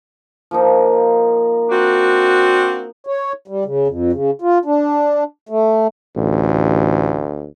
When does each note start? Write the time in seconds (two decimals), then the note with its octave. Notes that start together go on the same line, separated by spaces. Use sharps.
0.51 F3 A#3 D#4
1.70 C4 D4 F#4
3.07 C#5
3.48 G3
3.65 C#3
3.88 F2
4.13 C#3
4.42 F4
4.65 D4
5.49 A3
6.16 A1 D2